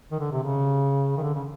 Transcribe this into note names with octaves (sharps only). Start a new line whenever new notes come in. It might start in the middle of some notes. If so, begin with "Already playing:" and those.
D#3
D3
C3
C#3
D#3
D3
C#3